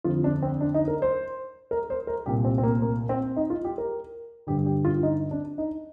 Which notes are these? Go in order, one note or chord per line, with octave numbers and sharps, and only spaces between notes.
F2 D3 F4
D4
C4
D4
D#4
A#4
C5
A#4
C5
A#4
C2 A#2 G4
C4
C4
A#3
A#3
C4
D#4
F4
G4
A#4
G2 D3 G4
G4
F4
D#4
D4
D#4